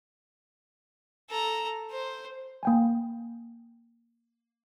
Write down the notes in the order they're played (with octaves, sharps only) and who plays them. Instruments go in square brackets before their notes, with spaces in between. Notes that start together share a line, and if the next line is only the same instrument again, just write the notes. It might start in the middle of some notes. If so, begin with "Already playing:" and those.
[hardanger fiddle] A4 A#5
C5
[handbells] A#3 G5 G#5